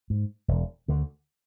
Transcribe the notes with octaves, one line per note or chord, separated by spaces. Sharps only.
G#2
E1
D2 D3